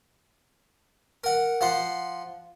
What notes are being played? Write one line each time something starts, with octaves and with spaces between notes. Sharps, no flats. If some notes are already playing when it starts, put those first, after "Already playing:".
A#4 F#5
F3 F#5 C6